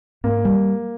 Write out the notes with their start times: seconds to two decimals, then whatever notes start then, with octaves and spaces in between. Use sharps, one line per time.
0.24 G#2 A#3
0.45 G3